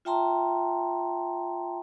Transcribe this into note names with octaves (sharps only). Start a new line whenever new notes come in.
F4 E5 G5 A5 A#5 C6